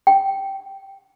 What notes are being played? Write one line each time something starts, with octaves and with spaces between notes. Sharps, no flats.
G5